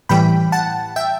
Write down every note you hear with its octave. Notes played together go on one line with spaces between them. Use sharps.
A2 E3 G3 G5 B5
F#5 A5
E5 G5